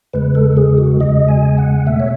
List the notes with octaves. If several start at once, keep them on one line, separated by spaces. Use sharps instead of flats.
E2 C#3 G#3 B4
A4
G#4
F#4
E2 C#3 G#3 D#5
G#5
F#5
B2 A3 E5
C#5